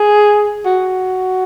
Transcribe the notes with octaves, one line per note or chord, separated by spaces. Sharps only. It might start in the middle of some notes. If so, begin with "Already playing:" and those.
Already playing: G#4
F#4